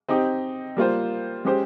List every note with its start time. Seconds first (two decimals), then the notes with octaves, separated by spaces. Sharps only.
0.08 C4 D#4 G4
0.77 G3 A#3 F4 C5
1.45 G#3 C#4 G4 C5